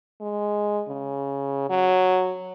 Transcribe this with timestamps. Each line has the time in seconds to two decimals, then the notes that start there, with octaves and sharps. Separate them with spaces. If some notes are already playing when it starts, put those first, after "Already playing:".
0.21 G#3
0.89 C#3
1.70 F#3